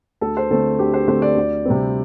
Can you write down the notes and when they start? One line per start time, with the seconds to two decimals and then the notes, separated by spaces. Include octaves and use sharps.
0.21 D2 A4
0.37 C5
0.51 D3 A3 C4 A4
0.79 D2 G4
0.94 C5
1.08 D3 A3 C4 C5
1.22 D5
1.36 D2
1.65 C3 G3 C4